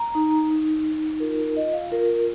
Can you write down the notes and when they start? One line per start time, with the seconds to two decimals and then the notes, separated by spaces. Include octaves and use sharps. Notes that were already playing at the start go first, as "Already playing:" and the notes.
Already playing: A#5
0.15 D#4
0.50 D#4
0.86 D#4
1.20 F4 A#4
1.38 A#4
1.57 F4 D#5
1.74 F5
1.91 F4 A#4